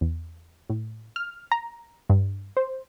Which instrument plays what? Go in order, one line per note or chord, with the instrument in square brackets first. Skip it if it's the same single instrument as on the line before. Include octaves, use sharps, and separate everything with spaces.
[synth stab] E2
A2
F6
A#5
G2
C5